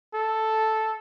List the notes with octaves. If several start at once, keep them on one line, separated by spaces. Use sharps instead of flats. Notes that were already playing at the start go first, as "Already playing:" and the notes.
A4